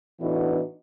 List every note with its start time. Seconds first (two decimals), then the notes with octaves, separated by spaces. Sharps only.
0.20 A2 E3 B3 D4 D#4 F#4